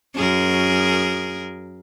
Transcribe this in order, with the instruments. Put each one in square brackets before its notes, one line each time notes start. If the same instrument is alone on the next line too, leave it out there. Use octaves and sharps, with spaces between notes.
[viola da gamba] F#2 G#4 A#4